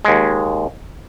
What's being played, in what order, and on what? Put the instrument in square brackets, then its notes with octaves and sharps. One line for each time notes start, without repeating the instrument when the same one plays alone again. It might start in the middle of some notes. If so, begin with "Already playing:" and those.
[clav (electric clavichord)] D#2 G#3